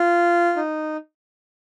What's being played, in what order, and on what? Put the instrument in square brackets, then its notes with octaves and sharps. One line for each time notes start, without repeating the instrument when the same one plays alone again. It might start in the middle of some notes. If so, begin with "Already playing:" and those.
Already playing: [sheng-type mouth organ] F4
D#4